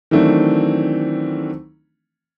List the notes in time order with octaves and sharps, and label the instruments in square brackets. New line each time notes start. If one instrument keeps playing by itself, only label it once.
[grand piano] D#3 E3 F#3 A3 C4 D4